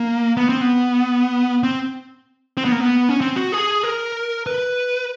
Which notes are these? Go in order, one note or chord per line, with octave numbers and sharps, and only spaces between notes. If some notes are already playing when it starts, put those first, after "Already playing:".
Already playing: A#3
B3
C4
B3
C4
C4
B3
A#3
B3
C#4
C4
F#4
G#4
A#4
B4